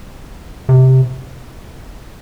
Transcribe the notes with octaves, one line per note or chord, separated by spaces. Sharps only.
C3